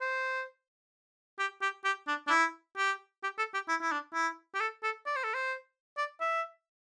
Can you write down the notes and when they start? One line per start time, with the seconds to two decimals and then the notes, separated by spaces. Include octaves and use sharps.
0.01 C5
1.39 G4
1.62 G4
1.85 G4
2.07 D4
2.27 D4
2.30 E4
2.77 G4
3.23 G4
3.38 A4
3.54 G4
3.68 E4
3.81 E4
3.91 D4
4.14 E4
4.54 G4
4.60 A4
4.83 A4
5.06 D5
5.16 C5
5.24 A4
5.34 C5
5.97 D5
6.21 E5